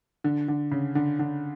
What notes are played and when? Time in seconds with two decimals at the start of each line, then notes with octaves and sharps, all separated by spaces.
0.24 D3
0.48 D3
0.71 C#3
0.95 D3
1.19 D3